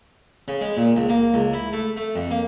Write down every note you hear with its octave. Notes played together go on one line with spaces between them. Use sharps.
C#3
G#3
A#2
C#2
A#3
C#2
E4
A3
A3
F2
A#3